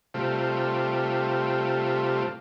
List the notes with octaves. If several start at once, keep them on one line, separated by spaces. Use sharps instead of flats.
C3 G3 A3 F4